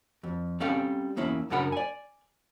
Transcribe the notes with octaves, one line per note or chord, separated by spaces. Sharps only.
F2
G3 C4 C#4 A4 F5 G5
E2 A#3 C#4 E4
F#2 C#3 D4 A#4 F#5 B5
D5 G#5